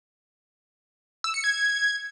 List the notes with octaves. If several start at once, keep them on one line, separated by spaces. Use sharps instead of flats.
E6
C#7
G#6